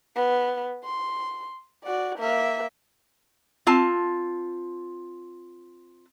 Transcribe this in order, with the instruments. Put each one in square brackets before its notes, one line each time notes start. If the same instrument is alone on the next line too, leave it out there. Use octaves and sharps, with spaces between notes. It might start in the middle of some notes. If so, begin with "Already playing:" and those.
[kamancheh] B3
C6
F#4 D5
A#3 E5
[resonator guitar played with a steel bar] C4 F4 A5